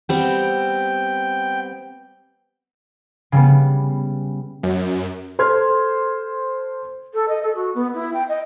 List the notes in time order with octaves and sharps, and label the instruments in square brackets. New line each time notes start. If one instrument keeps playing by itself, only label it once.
[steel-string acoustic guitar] G3 B3 C4 [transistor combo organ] G5
[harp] C#3 G3 B3
[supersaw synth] F#2
[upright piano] A4 C5 C6 F6 G#6
[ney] A4
D#5
A4
F#4
B3
E4
G5
D#5